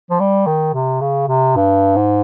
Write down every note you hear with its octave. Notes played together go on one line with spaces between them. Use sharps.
F3
G3
D#3
C3
C#3
C3
G2
G#2